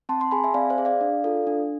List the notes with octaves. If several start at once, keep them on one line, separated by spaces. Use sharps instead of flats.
C4 A5 C6
A5 C6
G#4 G#5 B5
E5 G#5
C4 D5 F5
C5 E5
G#4
D5 F5
D4
F4 A4
D4